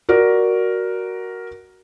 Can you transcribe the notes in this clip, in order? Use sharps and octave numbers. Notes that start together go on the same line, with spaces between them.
F#4 A#4 D5